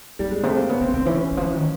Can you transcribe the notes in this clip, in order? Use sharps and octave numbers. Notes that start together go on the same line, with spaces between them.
G2 G3
G#3
C3 A3
A#3
C#3 B3
C#3 C4
C#3 C4
E3 C#4
D#3
F3
E3
D#3